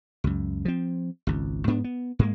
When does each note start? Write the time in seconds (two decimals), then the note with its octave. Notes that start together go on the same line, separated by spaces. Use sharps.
0.24 C#2 F#2
0.65 F3 C4
1.27 G#1 C#2
1.67 G#2 B3 D4
1.84 B3
2.19 G#2 G#3 A#3